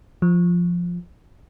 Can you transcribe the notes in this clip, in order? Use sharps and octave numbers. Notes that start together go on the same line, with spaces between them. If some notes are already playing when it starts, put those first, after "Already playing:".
F3